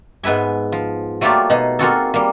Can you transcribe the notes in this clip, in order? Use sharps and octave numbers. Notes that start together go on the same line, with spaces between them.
G#2 B3 B4 E5 G#5
F3
F#3 A3 A#3 F4 G4 D5
B2 D#4 C6
A#3 C4 F4 F#4 G#4 A4
G3 A#3